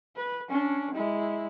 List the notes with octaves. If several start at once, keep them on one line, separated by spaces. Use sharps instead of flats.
B4
C#4 D4
G#3 E4